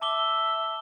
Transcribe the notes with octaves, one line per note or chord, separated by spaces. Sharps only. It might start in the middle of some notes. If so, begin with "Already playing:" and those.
E5 A5 D6 G7